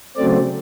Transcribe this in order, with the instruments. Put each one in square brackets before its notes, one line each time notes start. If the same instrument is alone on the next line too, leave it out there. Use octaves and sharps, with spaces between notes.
[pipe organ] C#3 F#3 A3 C4 D5